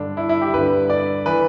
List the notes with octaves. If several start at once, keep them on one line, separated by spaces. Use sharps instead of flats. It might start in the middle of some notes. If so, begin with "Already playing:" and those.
Already playing: G2 D3 D4
E4
E4
G4
G2 D3 B4
D5
E3 B4